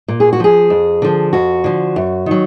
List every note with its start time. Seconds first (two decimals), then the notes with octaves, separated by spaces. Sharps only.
0.08 A#2
0.20 G#4
0.33 F#4
0.40 F3 G#4
0.70 F2
1.02 D3 F3
1.33 F2 F#4
1.64 D3 F3
1.96 F#2
2.26 D#3 F#3